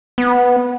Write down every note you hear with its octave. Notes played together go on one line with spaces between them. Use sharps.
B3